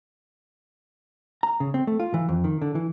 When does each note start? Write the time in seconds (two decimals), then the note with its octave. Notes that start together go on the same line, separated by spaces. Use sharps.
1.43 A#5
1.60 C#3
1.74 C4
1.87 A3
2.00 F4
2.14 E3
2.29 F2
2.44 D#3
2.62 D3
2.75 E3